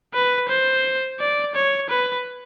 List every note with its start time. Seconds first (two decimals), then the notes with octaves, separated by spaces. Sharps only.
0.14 B4
0.48 C5
1.20 D5
1.55 C#5
1.90 B4